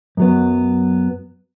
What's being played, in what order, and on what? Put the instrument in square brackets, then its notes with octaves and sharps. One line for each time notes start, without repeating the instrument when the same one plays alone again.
[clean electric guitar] F#2 F#3 B3